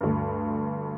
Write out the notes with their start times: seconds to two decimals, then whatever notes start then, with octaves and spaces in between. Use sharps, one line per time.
0.01 D2 G2